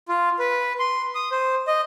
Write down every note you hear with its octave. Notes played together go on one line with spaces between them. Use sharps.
F4
B4
C6
D#6
C5
D#5